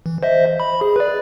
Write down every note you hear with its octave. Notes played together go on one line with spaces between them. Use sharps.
E3
C5 D#5 E5
B5
G#4
B4 D5